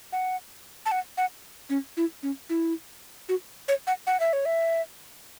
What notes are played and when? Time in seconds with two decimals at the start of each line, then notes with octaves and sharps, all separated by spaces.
0.12 F#5
0.86 A5
0.92 F#5
1.17 F#5
1.70 C#4
1.97 E4
2.23 C#4
2.50 E4
3.29 F#4
3.68 C#5
3.87 F#5
4.07 F#5
4.20 E5
4.33 C#5
4.46 E5